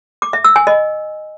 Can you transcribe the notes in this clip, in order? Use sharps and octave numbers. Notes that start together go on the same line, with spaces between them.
D6
E5
E6
G#5
D#5